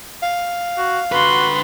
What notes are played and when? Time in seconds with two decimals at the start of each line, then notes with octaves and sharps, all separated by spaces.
0.22 F5
0.78 F#4
1.12 D3 F#4 B4 F#5 C6